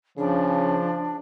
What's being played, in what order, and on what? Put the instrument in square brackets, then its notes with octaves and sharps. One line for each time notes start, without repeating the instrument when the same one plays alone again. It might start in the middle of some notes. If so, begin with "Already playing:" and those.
[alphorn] C#3 [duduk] F3 [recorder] D4